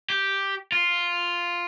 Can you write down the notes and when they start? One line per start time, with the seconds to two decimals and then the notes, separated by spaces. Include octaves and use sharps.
0.10 G4
0.72 F4